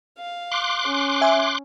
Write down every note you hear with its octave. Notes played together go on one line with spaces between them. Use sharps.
F5
C6 D6 F#6
C#4
E5 G#5